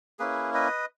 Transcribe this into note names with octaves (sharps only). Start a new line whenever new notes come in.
A#3 C#4 E4 G#4 B4
B4 D#5